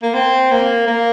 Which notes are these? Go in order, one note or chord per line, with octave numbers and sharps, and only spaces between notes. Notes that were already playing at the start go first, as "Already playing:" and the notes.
A#3
C4
A#3
A#3